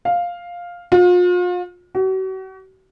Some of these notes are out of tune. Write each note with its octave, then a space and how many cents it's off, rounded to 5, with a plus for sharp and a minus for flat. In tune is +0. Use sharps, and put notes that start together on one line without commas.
F5 +5
F4 +40
F#4 +40